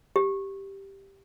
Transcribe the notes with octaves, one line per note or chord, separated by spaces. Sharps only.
G4